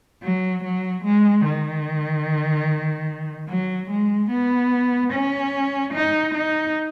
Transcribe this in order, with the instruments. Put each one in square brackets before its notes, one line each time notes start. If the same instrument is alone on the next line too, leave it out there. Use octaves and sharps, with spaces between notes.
[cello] F#3
F#3
G#3
D#3
F#3
G#3
B3
C#4
D#4
D#4